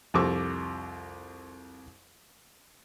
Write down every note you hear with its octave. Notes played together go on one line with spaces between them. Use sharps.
C2 F2 G4 C#6 D6 E6